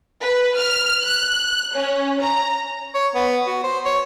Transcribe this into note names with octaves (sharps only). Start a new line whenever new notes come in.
B4
F6
F#6
C#4
A#5
C#5
B3
F#4
C5
C#5